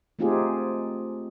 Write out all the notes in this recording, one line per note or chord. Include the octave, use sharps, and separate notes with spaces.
A3 C4 D#4 F4 G4 G#4